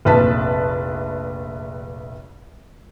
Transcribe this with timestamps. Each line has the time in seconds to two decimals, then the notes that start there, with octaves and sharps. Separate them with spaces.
0.05 F1 A#1 B4 A5 B6